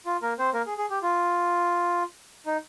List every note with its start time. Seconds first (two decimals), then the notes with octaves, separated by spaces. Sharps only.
0.06 F4
0.22 A#3 A#4
0.39 C4 C5
0.54 A#3 A#4
0.66 G#4
0.78 G#4
0.90 G4
1.02 F4
2.46 D#4